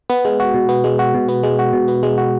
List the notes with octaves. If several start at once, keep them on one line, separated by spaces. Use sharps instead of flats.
B3
G#3
F#4
B2
B3
G#3
F#4
B2
B3
G#3
F#4
B2
B3
G#3
F#4